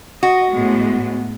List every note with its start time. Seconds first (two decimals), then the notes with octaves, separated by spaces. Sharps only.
0.23 F#4 D#5
0.52 A2 G#3 B3